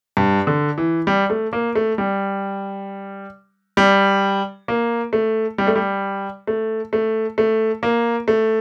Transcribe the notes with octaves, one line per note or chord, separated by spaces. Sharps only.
G2
D3
E3
G3
A3
A#3
A3
G3
G3
A#3
A3
G3
A3
G3
A3
A3
A3
A#3
A3